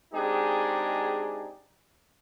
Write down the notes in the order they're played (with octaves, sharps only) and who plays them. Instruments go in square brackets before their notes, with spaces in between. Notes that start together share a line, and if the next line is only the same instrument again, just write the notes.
[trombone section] G#3 C4 D4 D#4 G4 G#4